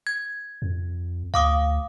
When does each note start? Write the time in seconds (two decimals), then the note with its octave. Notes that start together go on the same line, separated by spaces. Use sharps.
0.07 G#6
0.62 F2
1.34 D2 F5 D6 D#6